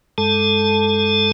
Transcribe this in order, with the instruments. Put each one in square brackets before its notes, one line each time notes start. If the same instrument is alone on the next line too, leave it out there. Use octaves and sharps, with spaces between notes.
[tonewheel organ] G2 G#3 A4 A5